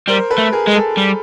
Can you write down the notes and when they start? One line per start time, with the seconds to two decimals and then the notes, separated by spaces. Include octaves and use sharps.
0.08 G3 A#4 C5
0.30 A4 B4
0.38 A3
0.52 G#4 A#4
0.67 G#3
0.75 A4
0.97 G3